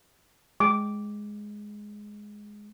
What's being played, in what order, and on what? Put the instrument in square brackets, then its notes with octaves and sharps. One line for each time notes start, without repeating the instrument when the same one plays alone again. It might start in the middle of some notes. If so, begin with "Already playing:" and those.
[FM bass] G#3 [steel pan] D6